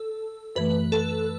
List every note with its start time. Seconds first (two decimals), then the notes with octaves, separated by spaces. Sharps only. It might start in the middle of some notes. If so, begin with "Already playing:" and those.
Already playing: A4
0.56 F#2 E3 A3 B4
0.92 A4